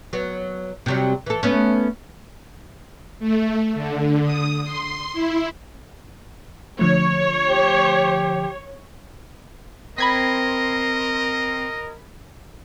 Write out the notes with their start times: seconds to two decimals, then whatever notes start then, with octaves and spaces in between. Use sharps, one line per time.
0.13 F#3 B3
0.86 C3 F#3 G3
1.26 E3 A4
1.43 A3 B3 C#4
3.19 A3
3.74 D3
4.24 D#6
4.63 C6
5.13 E4
6.79 D3 F3 A3 C#5
7.49 G4
9.98 C4 A#4 D#5 B5 G#6 B6